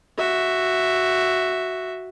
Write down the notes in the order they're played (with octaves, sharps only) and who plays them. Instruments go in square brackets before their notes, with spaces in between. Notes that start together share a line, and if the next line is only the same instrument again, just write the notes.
[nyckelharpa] F#4 E5